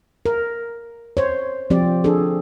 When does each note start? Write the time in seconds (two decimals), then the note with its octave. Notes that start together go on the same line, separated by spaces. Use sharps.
0.26 A#4
1.17 C5 C#5
1.70 F3 C4 G4 D5
2.04 D4 G#4 A4